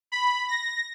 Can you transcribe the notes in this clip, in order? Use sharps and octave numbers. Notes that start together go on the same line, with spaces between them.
B5
A#6